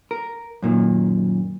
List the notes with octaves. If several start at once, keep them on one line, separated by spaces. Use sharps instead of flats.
A#4
F#2 A#2 D#3